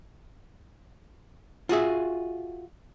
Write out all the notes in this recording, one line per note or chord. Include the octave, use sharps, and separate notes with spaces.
F4 F#4 G#4 E5